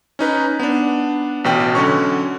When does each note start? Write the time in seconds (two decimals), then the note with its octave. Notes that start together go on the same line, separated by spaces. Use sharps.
0.19 C#4 D#4 B4
0.59 B3 D4
1.44 A1 B2 G5
1.75 D3 F#3 C#4 C#6